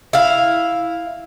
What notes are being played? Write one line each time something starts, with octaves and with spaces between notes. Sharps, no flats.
E4 F5